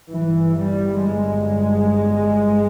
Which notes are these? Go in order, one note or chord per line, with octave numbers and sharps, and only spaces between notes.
G1 G2 E3
G3
G#3